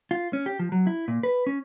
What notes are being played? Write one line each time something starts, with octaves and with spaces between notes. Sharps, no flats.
F4
C#4
G4
F3
F#3
E4
A#2
B4
C#4